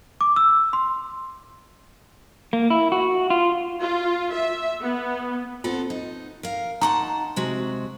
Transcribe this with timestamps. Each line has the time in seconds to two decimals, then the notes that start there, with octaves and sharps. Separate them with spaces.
0.21 D6
0.36 E6
0.73 C6
2.53 A#3
2.70 E4
2.92 F#4
3.30 F4
3.81 F4
4.34 E5
4.82 B3
5.64 B3 C4 F4 A4
5.90 D#4
6.43 A#4 F5
6.81 D#4 F#5 A5 A#5 C6 C#6
7.36 C3 G#3 F#4